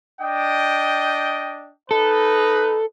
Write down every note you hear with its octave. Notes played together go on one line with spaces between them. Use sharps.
D4 D#5 G5
D#4 A4 B4